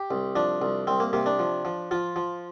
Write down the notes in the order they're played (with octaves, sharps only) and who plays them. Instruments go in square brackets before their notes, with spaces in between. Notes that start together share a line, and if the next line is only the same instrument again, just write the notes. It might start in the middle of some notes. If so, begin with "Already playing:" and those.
Already playing: [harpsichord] G4
C2
F3 D4
C2
C2 C4
A#3
C3 A#3
D4
F3
F3
F3 F4
F3